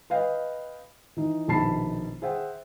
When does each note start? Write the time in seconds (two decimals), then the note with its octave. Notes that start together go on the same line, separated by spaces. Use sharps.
0.10 B4 D#5 F5 G5
1.17 E3 D#4
1.48 A#1 B2 D#3 A5 B5 C7
2.22 G#4 C5 E5 F#5 G5